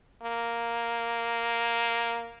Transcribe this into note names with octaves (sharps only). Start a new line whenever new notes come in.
A#3